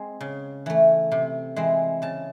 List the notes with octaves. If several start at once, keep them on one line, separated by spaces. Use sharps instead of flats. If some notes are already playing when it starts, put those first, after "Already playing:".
Already playing: G#3 C4 G#5
C#3
E3 A3
C3
E3 G#3 C4
C#3 A5